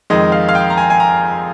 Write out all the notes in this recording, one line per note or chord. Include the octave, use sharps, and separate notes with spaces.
F2 D#3 G#3 D#5
F5
F5
G5
A#5
G#5
G#5
A#5